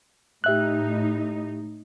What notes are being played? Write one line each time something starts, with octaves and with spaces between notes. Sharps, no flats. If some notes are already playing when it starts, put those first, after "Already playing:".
A2 D#4 G4 E5 F#6